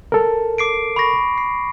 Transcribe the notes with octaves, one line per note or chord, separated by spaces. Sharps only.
A4 A#4
D6 C7 D7
B5 C#6 A#6
C7